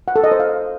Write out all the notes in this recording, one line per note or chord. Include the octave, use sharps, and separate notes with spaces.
F#5
A4
D#5
C5
F5